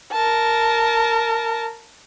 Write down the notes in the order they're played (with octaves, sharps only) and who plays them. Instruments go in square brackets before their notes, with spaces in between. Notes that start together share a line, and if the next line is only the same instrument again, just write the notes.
[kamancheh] A#4 A5